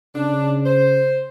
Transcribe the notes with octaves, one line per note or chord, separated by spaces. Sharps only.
C#3 D4
C5